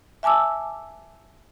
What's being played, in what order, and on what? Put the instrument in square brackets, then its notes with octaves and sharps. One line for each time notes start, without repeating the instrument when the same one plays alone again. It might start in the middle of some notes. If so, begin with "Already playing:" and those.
[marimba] E5 G#5 A5 D6 E6